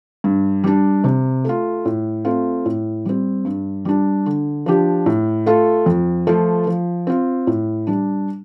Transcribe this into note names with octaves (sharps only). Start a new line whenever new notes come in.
G2
G3 D4
C3
A3 F4
A2
A3 C4 F4
A2
G3 C4
G2
G3 D4
D3
F3 D4 G4
A2
A3 F4 A4
F2
F3 A3 F4 A4
F3
C4 F4
A2
G3 D4